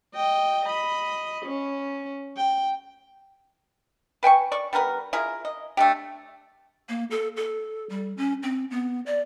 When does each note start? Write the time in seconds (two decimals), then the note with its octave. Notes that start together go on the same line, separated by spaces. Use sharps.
0.15 D#5 G5
0.65 D#5 B5
1.46 C#4
2.37 G5
4.23 B4 G5 G#5 C#6
4.52 D5 C#6
4.73 G3 B3 A#4 B4
5.13 E4 F4 G#4 A#4
5.45 D#5
5.77 A3 D4 G4
6.89 A#3
7.11 A4
7.37 A4
7.90 G3
8.17 C#4
8.43 C4
8.71 B3
9.06 D5